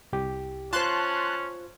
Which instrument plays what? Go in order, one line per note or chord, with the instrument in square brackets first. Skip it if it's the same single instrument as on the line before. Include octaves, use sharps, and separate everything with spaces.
[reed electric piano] C2 G4
[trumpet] C#4 [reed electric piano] F4 C5 [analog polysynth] A5 C6 F#6